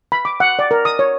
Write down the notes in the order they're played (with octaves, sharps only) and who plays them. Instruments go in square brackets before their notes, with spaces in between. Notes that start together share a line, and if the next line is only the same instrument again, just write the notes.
[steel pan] B5
D6
F#5
D5
A#4
D#6
C#5